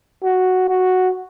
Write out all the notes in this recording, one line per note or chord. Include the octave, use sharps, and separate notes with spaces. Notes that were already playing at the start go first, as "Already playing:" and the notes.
F#4
F#4